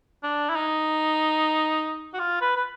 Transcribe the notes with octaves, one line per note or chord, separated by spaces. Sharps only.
D4
E4
D#4
F#4
F4
B4
B4